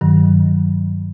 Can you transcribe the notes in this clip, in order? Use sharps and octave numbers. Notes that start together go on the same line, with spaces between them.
G2 D#3 F#3